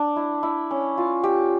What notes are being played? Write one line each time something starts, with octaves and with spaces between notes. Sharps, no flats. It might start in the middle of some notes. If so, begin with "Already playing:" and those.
Already playing: D4
E4
E4
C#4
F4
G4